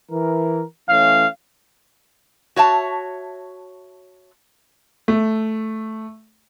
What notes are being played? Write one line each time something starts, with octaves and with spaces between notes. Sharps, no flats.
E3 A#4
E3 A3 C#4 F5
F#4 C#5 E5 A5
A3